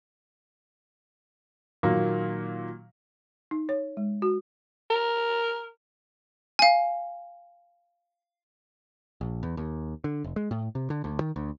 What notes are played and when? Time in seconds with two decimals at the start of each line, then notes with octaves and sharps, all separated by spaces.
1.83 A#2 D#3 F#3 A#3
3.51 D#4
3.69 C#5
3.97 G#3
4.22 F#4
4.90 A#4
6.59 F5 G#5
9.21 A#1
9.43 E2
9.57 D#2
10.04 D3
10.24 F1
10.36 G#3
10.51 A2
10.75 C3
10.90 D3
11.04 D2
11.20 D#3
11.36 D2